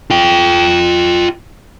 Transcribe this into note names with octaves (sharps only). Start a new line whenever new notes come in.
F4 G5